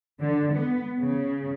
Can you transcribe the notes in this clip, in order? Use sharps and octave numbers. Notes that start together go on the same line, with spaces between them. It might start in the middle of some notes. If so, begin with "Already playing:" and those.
D3
B3
C#3